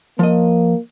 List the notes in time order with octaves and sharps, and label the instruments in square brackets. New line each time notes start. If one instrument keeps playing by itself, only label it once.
[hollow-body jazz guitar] F3 D#5 [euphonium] A#3